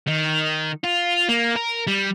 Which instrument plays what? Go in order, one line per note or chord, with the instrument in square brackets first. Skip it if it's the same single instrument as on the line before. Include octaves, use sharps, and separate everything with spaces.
[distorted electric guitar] D#3
F4
A#3
A#4
G3